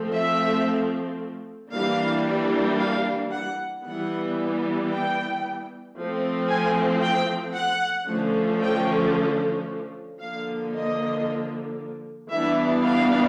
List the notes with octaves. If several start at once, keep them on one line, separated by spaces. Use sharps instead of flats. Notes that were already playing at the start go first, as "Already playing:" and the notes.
Already playing: F3 A3 C4
E5
E3 G3 A#3 D4 F5
F5
F#5
E3 G3 B3 F#5
G5
F3 A3 C4
G#5
G5
F#5
D3 F3 A3 C#4
G5
D3 F3 A#3 F5
D#5
E3 G3 B3 D4 E5
F5